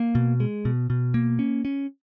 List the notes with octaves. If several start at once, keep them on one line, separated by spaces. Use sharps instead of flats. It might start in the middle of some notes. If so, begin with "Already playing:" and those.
Already playing: A#3
B2
G#3
B2
B2
A#3
C#4
C#4